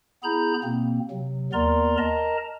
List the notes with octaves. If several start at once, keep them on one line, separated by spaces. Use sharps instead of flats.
B3 E4 G#4 A#5 B5 G6
B2 A#3 C4
C3 F#3
D#2 B3 A#4 D5 A#5 C6
A#4 D#5 A5 A#5